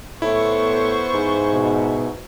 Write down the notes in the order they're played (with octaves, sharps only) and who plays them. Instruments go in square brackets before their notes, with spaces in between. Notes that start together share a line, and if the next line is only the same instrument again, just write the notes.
[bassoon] A2 [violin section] B3 C5 C#6 [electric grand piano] E4
[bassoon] G#2
[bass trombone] B2